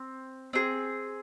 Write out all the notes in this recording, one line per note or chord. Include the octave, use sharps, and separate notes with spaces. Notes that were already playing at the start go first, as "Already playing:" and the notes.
Already playing: C4
C4 G#4